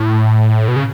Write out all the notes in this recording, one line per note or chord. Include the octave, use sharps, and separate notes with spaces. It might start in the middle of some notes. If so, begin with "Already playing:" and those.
Already playing: A2
B2
C#3